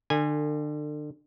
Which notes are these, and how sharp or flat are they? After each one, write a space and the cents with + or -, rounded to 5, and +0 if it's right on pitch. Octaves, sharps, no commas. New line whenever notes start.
D3 +30 G#5 -15